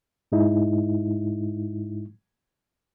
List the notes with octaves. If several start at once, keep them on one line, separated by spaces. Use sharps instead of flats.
G#2 G#3 D#4 E4